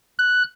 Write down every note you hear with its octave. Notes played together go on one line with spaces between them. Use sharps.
F#6